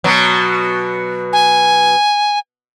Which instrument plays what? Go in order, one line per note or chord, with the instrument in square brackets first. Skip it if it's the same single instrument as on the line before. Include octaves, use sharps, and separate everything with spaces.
[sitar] B2 F#3
[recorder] G#5